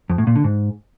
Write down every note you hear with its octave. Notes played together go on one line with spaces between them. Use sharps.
F2
A2
A#2
D3
G#2